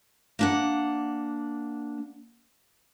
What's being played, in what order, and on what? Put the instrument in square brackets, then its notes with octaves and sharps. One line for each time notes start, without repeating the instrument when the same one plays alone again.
[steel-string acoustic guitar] A#3 D4 F#5